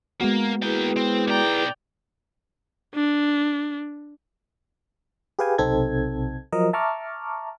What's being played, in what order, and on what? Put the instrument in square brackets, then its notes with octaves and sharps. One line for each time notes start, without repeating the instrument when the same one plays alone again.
[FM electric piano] G#3 B3 F#4 [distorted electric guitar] A#3
[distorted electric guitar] A#3 G5 [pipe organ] E4 G#4 B4
[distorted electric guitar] C4
[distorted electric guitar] B1 A#5 [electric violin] D5 G5
[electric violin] D4
[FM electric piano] G4 G#4 B4 F5 G5 G#5
B1 C3 C4 D#4 A4 G#6
F3 F#3 A#4 D#5
E5 A5 A#5 C#6 D6 F6